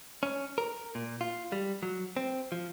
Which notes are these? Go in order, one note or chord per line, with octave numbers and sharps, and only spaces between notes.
C#4
A#4
A#2
F4
G3
F#3
C4
F3